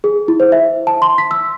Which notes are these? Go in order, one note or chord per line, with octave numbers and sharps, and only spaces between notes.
G#4
E4
C5
E5
A5
C6
B6
E6